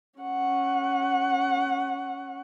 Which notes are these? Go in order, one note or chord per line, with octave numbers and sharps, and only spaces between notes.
C#4 F#5